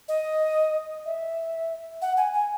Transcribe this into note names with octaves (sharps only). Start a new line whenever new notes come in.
D#5
E5
F#5
G#5
G#5